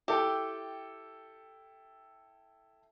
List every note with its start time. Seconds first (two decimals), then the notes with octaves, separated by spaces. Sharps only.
0.08 E4 G4 A4 G5